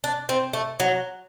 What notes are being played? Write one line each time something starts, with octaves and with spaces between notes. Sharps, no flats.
D4
C4
A3
F#3